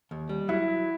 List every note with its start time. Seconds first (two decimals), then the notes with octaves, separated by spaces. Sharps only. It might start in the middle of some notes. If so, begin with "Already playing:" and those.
0.11 D#2
0.29 G3
0.49 F#3 E4